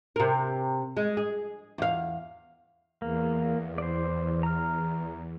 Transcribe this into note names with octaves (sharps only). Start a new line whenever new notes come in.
C3 A#4
G#3
G#4
E2 F5
E2 A#3
C5 D5
A#5 F6